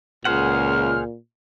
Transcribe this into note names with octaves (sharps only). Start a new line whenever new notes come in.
C#2 A#2 G#4 C5 F#5 F6